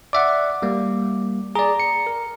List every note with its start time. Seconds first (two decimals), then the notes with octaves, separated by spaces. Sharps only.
0.13 D5 E5 F#5 D6
0.62 G3 A#3
1.55 G#4 D5 A#5
1.80 C#7
2.07 A#4